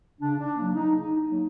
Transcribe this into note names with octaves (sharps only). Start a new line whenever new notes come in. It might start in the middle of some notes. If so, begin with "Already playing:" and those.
C#3 D4
D4
F#3 A#3
D#4
C#3 D#4
D#4
F#3 A#3